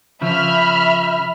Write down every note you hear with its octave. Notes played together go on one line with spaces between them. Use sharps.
C#3 F3 E5 B5 F6